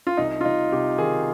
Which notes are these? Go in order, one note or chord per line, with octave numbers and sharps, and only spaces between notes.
F4
C2 D#4
F4
C2 D#4
C3 G4
D#3 G#4